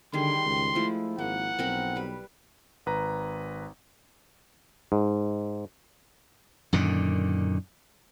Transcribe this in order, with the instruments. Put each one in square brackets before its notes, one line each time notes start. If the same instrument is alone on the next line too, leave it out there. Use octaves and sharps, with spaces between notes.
[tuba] D3 [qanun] D#3 G3 G#4 [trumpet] C6
[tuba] C#2
[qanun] F3 G#3 E4 [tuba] A3
[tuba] G#1 [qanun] A#3 [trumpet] F#5
[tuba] B1 [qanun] C4 A#4 B5
[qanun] G3 B4
[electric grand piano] G#1 B4 A#5
[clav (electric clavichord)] G#2
[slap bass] F#2 A#2 D3 D#3